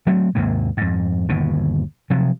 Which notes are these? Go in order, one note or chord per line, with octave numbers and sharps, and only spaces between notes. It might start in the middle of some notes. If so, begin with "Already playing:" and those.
F#3 A3 B3 C4
D#2 G#2 C3 A#3
F2 G#2
G1 D#2 B2
C3 F3 F#3